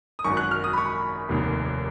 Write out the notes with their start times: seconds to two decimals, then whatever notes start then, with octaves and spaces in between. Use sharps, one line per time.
0.19 D#6
0.24 G#1 F#2 D#3 C#6
0.37 F#6
0.51 F6
0.64 D#6
0.73 B5
0.78 C#6
1.29 F1 D#2 D#3